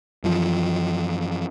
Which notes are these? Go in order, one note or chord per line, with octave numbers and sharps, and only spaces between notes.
F#2 E3 F3